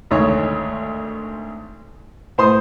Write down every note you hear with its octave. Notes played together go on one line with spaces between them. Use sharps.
G#1 D2 C#5
A2 C5 C6 D#6